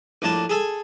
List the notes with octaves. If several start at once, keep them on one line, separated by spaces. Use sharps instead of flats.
A#1 A2 D4 A5
G#4 A4 G#5